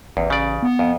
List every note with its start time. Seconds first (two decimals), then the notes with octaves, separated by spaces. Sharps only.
0.17 A1 E2
0.30 C#3 D5
0.63 B3
0.79 F2